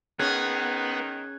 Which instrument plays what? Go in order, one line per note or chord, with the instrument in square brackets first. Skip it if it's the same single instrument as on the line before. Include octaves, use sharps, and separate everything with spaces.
[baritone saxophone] D#3 [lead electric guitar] B3 [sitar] C#4 G#4 [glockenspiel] F#6 G#6